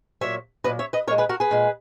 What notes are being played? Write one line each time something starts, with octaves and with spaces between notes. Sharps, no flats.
A#2 F#3 C#5 E5
A#2 F#3 B4 D#5
C#5 E5
B4 D#5
A#2 G#3 A#4 C#5
G#4 B4
F#4 A#4
G#4 B4
A#2 G#3